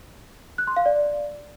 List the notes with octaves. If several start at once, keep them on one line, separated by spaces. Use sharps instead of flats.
F#6
C6
F5
D5